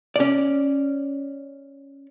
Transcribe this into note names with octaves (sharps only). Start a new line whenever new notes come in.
C#4 D5